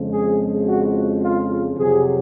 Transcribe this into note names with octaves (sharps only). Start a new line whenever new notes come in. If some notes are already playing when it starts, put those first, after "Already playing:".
Already playing: F2 C#3 F3 G#3
G#4
F#4
F4
F2 C3 F#3 G#4